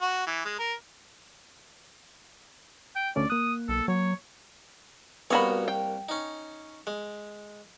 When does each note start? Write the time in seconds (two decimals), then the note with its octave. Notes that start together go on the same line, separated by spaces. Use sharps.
0.01 F#4
0.27 E3
0.45 G#3
0.59 A#4
2.96 G5
3.16 D2 A3 C#4 D5
3.30 A#3 D#6 F#6
3.69 B1 A4
3.88 F#3 C#5
5.30 C2 A#3 B3 F#4 C#5 B5
5.68 G5
6.09 C#4 D#4
6.87 G#3